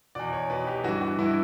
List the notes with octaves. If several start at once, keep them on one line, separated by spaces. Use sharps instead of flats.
E2 B2 D5
C#5
E2 B2 B4
G4
G2 E3 F#4
F#4
G2 E3 E4